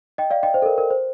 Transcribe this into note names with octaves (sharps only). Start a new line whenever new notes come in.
D#5 G5
D5 F5
D#5 G5
C5
A4
A#4
A#4
C5